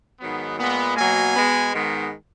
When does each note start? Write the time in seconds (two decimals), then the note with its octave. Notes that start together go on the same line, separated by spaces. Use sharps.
0.20 G#2 D#3 F#3 B3
0.58 A#2 G#3 B3
0.97 B2 F#3 A#3 G#5
1.35 B2 G#3 B3
1.73 G#2 D#3 G#3 B3